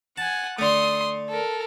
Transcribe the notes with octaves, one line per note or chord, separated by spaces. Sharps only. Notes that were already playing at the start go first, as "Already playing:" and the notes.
F#5 G#5 A5
D3 A3 C6 D#6
A4 A#4